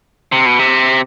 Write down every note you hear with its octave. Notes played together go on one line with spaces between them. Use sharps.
C3
B2
C3